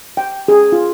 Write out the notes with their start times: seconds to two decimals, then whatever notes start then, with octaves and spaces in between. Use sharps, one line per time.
0.17 G5
0.48 G#4
0.72 F4